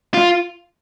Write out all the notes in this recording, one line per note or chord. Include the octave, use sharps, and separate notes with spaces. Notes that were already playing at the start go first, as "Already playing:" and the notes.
F4